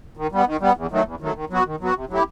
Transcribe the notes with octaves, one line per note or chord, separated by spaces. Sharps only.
D#3
G3 B3
D#3
G3 B3
E2
D#3 F#3 A3
E2
D#3 F#3 A3
D#3
F#3 B3 F#4
D#3
F#3 B3 F#4
C3
F#3 A3 E4 G4